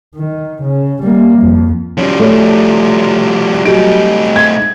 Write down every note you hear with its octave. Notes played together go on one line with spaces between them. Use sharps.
D#3
C#3
G3 A#3
F2
F3 G3 C#4
A3 C#5
F#3 G3 A3 D#4 D7
G#6